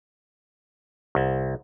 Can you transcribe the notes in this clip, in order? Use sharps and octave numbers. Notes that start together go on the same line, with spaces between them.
C2